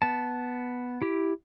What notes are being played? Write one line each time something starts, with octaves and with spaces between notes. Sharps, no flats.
B3 A5
E4 G4